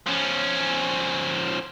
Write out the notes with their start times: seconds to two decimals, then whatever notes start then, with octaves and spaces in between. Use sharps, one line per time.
0.07 F3 C#4